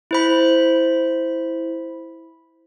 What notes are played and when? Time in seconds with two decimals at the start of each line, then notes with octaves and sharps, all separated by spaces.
0.11 E4 C5 B5